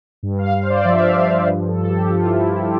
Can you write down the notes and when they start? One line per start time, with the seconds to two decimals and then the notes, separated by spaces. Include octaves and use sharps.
0.23 G2
0.39 F5
0.54 G2 F5
0.63 C5
0.70 D5
0.85 F3 E5
1.01 F5
1.16 F3 F5
1.32 D5
1.47 G2 B4
1.68 A4
1.79 G2
1.85 A4
1.89 G4
2.10 F3 F4
2.25 E4
2.41 F3 E4
2.57 G4